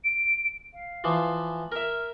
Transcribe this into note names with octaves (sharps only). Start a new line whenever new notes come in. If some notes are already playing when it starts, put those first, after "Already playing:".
D7
F5
E3 F3
A#4 E5 F6